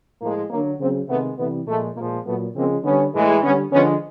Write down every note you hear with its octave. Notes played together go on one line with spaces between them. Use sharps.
A2 F3 G#3 A#3
D3 F#3 A#3
C#3 F#3 A#3 C4
C3 D#3 G#3 A3 B3
C3 E3 G3 A3 B3
A#2 F3 G#3 A3
A#2 F3 G#3 A#3
A#2 F#3 A3 B3
C#3 F3 G#3 A#3 C4
D3 G3 B3 C#4
A2 E3 G#3
D3 G3 B3 C#4
D3 F3 G#3 B3 C#4